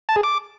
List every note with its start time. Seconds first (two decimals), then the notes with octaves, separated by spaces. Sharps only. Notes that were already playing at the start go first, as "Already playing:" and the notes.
0.09 A5
0.16 G#4
0.23 D6